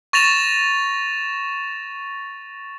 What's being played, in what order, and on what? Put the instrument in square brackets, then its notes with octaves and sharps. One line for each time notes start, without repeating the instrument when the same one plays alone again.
[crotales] C#6 A6 A#6 E7 F7